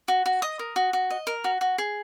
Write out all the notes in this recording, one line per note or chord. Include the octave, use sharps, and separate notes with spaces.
F#4
F#4
D#5 D#6
A#4
F#4
F#4
D#5
A#4
F#4
F#4
G#4